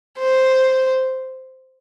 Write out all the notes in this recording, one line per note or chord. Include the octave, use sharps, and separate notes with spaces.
C5